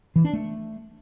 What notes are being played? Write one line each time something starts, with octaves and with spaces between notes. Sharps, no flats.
E3
D4
A3